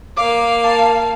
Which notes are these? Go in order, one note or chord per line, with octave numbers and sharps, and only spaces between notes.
A#3 F5 D6
A5